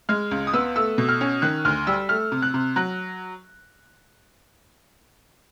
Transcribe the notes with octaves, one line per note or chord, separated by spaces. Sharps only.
G#3 F6
C#2
D#6
B3 E6
A3 E6
B2
F6
C#4
D#3 F#6
D2 F6
G3 E6
A3 F6
C3
F#6
C3
F#3 F#6